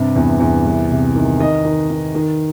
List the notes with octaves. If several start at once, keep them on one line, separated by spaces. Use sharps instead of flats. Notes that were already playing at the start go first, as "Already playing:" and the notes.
Already playing: G2 C3
E2
E2
C2
C3
D#3
D#3 D#5
D#3
D#3
D#3